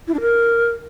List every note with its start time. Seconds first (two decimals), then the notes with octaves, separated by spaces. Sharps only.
0.08 E4
0.14 D4
0.21 A#4